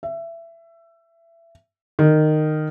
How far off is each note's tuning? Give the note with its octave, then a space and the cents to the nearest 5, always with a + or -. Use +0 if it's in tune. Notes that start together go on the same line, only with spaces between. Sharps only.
E5 +20
D#3 -15